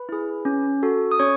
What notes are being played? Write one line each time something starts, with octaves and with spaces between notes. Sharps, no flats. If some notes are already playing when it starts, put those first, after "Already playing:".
Already playing: B4 B5
E4 G#4
C#4
F#4 A4
D#6
C#4 C#5 C#6